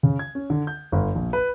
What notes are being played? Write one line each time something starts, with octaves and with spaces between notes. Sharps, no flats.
C#3
G#6
C#4
D3
G6
G1
A#1
B4